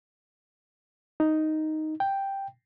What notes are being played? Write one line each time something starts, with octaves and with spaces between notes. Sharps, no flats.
D#4
G5